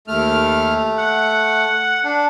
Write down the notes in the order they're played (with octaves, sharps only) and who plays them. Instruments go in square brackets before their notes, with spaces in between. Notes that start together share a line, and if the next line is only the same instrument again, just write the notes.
[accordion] D#2 F6 [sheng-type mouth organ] A3
[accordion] F#5
[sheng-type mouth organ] D4